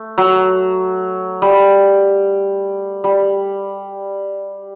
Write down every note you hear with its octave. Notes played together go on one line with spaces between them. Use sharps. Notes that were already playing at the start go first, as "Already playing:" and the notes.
Already playing: A3
F#3
G3
G3